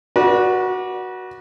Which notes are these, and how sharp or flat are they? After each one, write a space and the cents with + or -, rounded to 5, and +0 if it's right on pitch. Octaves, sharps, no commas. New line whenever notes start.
F#4 +0 B4 -40 D5 +0